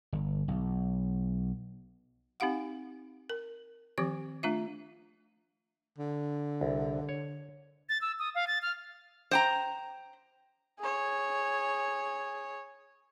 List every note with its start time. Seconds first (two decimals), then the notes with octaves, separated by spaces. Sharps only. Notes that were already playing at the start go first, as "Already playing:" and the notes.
0.12 G1
0.48 B1
2.40 C4 D#4 G4 F5 F#5
3.30 A#4
3.98 D#3 F3 C4 G4 D6
4.43 A3 D4 F4 E5
5.98 D3
6.61 C2
7.09 C#5
7.89 A6
8.01 E6
8.19 D#6
8.35 F5
8.47 A6
8.62 F6
9.31 C5 G5 A#5
10.80 G#4 C#5